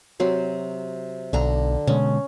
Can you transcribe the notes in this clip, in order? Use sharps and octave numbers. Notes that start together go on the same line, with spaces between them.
C3 F#3 C4
B1 D3 D4 A#5
B2 D3 G#3 C#4